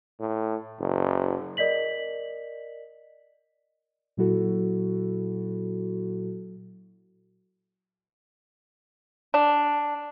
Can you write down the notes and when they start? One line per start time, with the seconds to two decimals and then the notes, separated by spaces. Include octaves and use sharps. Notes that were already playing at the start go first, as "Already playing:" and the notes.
0.20 A2
0.80 F#1
1.57 A#4 D5 D#5 B6 F#7
4.17 A#2 F#3 E4 F#4 A4
9.34 D4